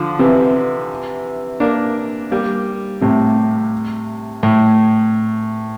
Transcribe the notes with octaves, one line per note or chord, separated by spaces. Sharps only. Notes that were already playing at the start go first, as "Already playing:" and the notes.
Already playing: D3 F3
C3 E3
A#3 D4
G3 A#3
A2 C3
A2